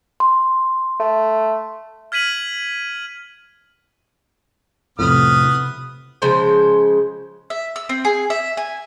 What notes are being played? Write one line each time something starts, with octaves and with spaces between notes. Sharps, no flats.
C6
A3
F6 G#6 B6 D#7 F#7
F2 A2 C3 B3 D#6 F6
C#3 F3 G#3 C5
E5
E6
C4
G#4
E5
G#5